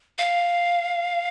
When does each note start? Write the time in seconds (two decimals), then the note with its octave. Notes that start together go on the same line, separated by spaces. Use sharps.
0.18 F5